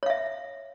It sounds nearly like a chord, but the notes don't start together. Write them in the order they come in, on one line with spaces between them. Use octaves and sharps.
C#5 F5 E5